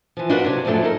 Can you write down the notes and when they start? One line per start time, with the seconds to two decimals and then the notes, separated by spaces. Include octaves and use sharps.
0.17 E3 F3
0.29 D4 D#4 F4 F#4 A#4 B4
0.44 C3 F#3 D4
0.65 F2 G#2 F3 F#3 A3 D4
0.82 D#4 A4 A#4